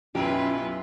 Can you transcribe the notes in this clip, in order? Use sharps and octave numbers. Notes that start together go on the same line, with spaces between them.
B1 F#2 C#4 E4 F4 G4 B4